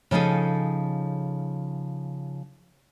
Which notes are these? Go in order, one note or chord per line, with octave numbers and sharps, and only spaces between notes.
C#3 F3 D#4 G#4 A4